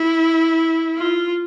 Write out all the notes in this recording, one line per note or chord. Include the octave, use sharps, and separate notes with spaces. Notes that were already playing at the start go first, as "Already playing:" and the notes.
Already playing: E4
F4